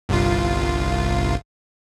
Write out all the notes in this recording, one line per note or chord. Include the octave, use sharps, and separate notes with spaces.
G1 C2 F4